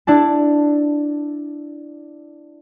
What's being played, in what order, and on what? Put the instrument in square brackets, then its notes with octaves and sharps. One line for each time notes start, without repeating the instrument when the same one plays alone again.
[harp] D4 E4 A5